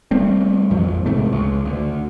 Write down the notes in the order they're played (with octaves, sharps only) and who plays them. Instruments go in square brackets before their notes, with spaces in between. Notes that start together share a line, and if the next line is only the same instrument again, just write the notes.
[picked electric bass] G3 A3 C4
A1 F2 F3
G#1 G#2 C3 A3
C#2
D2